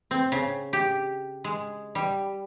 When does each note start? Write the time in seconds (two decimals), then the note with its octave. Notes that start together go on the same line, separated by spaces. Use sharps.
0.11 C4
0.32 C#3
0.73 G4
1.44 G#3
1.95 G3